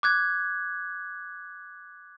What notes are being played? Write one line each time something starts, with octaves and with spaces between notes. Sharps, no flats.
D6 F#6 G#6